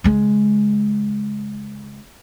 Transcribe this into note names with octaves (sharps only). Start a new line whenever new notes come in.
C#3 G#3